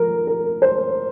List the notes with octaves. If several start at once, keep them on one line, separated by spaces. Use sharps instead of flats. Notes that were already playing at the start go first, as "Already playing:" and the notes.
Already playing: F3 A3 A#4
A#4
C5